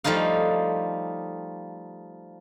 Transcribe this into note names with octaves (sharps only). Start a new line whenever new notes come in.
F3 G3 A3 D#4 F5